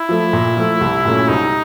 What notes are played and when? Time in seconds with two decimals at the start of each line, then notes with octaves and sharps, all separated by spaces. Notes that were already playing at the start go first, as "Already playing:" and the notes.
Already playing: E4
0.09 F3 A3
0.33 A#2
0.57 F3 A3
0.81 C2
1.05 A#2 F#3 A3 C#4
1.28 C2 D#4